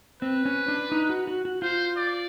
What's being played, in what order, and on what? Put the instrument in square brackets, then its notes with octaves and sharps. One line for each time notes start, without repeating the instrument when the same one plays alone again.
[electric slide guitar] C4 [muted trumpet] B4
[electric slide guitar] C#4
D4
D#4
F#4
F#4
F#4
[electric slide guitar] F4 [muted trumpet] C5
[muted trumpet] D5